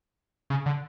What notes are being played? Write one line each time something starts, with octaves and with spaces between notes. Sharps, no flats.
C#3
D3